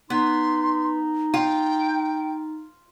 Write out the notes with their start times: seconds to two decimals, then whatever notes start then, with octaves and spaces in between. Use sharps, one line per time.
0.10 B3 D#4 C6
1.34 F4 G5